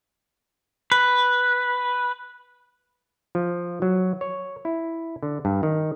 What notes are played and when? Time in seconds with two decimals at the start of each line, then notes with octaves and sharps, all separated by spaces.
0.92 B4
3.35 F3
3.82 F#3
4.21 C#5
4.65 E4
5.23 D3
5.45 G2
5.63 D#3